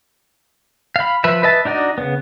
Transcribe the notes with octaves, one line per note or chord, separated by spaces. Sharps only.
F5 B5
F3 B4 E5
B4 D#5 E5 A5
D4 D#4 F#4 D5 D#5
C#3 B3